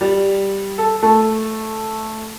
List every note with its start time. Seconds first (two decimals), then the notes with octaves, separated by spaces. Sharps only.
0.01 G3 G4
0.78 A4
1.03 A3 A4